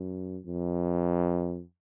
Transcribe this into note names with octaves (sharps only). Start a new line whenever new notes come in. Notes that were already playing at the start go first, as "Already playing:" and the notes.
Already playing: F#2
F2